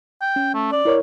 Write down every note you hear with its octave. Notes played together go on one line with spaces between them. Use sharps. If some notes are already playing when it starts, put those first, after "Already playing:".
G5
C#4
A3
D5
E4 A#4 C#5